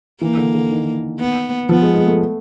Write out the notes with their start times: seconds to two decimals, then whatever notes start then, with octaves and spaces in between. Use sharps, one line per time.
0.21 E3 A#3
0.37 D3
0.55 D3
0.70 D#3
1.20 B3
1.69 F3 B3
1.82 G#3
1.94 G#3
2.07 A3